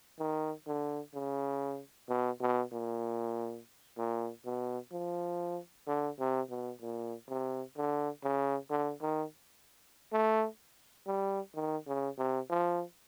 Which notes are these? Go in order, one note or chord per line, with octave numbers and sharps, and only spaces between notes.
D#3
D3
C#3
B2
B2
A#2
A#2
B2
F3
D3
C3
B2
A#2
C3
D3
C#3
D3
D#3
A3
G3
D#3
C#3
C3
F3